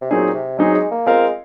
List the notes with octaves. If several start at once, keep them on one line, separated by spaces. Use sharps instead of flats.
C3
A#2 F#3 C4 D#4 G#4
C3
F#3 G#3 C4 D#4 G#4
G#3
A#3
G#3 C4 F4 A#4 F5